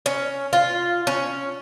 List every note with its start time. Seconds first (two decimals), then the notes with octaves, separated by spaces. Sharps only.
0.06 C#4
0.53 F4
1.07 C#4